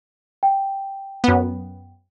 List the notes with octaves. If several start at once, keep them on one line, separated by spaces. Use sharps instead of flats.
G5
F#2 B3